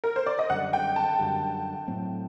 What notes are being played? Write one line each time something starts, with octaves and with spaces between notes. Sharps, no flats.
A#4
C5
D5
D#5
F#2 D3 G3 F#5
G5
A5
F#2 D3 G3
A2 F#3 A3 C4